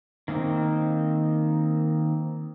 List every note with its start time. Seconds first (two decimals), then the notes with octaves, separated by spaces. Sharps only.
0.28 D#3 A#3 C4 D#4